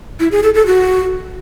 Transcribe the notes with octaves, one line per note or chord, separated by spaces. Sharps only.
E4
G#4
A4
A4
F#4